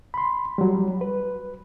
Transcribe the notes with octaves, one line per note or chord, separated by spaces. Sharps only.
B5 C6
F#3 G3
B4